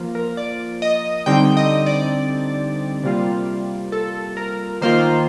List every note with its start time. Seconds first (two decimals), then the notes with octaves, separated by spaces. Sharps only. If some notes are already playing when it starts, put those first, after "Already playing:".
Already playing: F3 A#3 F4
0.15 A#4
0.37 D5
0.82 D#5
1.26 D3 G3 C4 D#4 G5
1.57 D#5
1.86 D5
3.04 C3 G3 A#3 F4
3.92 A4
4.37 A#4
4.82 D#3 A#3 F4 C5